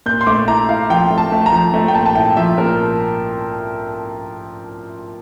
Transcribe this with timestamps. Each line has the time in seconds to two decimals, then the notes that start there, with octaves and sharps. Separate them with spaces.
0.06 A#2 G6
0.21 C6
0.27 A3 D6
0.48 E4 A#5
0.69 E4 F5
0.90 F3 G5
1.10 A3
1.18 A5
1.32 A3
1.46 A#5
1.53 F3
1.74 A3
1.88 G5
1.95 A#2 A5
2.06 A5
2.15 E4 G5
2.37 F3 E5
2.58 A#2 A#4